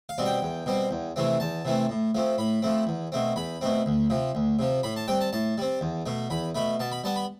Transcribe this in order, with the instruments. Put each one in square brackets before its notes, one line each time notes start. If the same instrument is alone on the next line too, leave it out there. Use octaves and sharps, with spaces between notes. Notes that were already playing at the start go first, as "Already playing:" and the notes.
[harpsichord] F5
B2 G3 C4
G5
E2
B2 G3 C4
E2
C3 E3 A3 C4
E2 A5
C3 E3 A3 C4
A2
F3 A3 C4
A2 B5
F3 A3 C4
E2
B2 A3 C4
E2 B5
B2 A3 C4
D2
C3 F3
D2
C3 F3
A2 B5
A5
G3 C4 G5
A5
A2 A5
G3 C4
E2
B2 A3
E2 B5
B2 A3 B5
B2 A5
B5
G3 B3 A5
B5